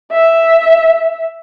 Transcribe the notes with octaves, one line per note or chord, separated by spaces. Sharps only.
E5